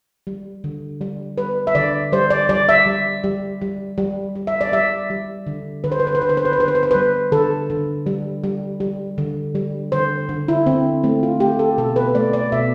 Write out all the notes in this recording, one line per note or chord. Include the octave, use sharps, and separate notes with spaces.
G3
D3
G3
G3 B4
E5
D3 D5
G3 C5
D5
G3 D5
E5
G3
G3
G3
G3
G3
E5
D5
G3 E5
G3
D3
D3 B4
C5
B4
C5
B4
D3 C5
B4
C5
B4
C5
D3 B4
C5
B4
C5
G3 B4
D3 A4
D3
G3
G3
G3
D3
G3
D3 C5
D3
E4
D3 C4
A3 C4
F4
A3 G4
A4
B2 A4
B4
A3 D5
D5
B2 E5